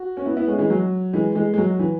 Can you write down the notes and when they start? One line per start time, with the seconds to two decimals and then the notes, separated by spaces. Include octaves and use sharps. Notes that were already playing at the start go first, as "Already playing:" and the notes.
Already playing: F#4
0.17 C#4
0.26 B3 E4
0.37 B3 E4
0.48 G#3 C#4
0.58 E3 G#3
0.70 F#3
1.13 E3 G#3
1.35 E3 G#3
1.54 G#3
1.58 F#3
1.79 E3